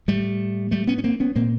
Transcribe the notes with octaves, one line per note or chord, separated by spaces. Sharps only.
A2 G3 A3
G3 A3
B3 C#4
C#4
A#3 C4
B3 C#4
A#2 A#3 C4